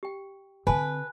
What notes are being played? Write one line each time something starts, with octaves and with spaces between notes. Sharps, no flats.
G4 G5
D3 C4 B4 G#5 A5